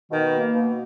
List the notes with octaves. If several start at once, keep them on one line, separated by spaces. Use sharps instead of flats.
B2 D#3
A#3
B2